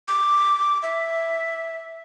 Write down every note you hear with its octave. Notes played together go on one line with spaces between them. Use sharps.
D6
E5